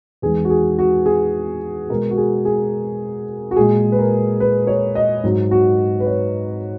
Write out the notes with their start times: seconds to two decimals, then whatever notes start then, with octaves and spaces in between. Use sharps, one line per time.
0.22 E2 D#3 G#3 G#4
0.45 F#4
0.50 G#4
0.79 F#4
1.06 G#4
1.90 B2 G#3 A#4
2.11 F#4
2.17 G#4
2.45 G#4
3.51 F#4
3.56 A#2 G#3 G#4
3.92 B4
3.99 A#4
4.40 B4
4.67 C#5
4.95 D#5
5.24 G#2 F#3
5.51 F#4
6.00 B4
6.07 C#5